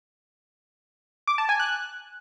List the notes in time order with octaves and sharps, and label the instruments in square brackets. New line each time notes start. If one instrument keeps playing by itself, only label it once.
[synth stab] D6
A5
G#5
F#6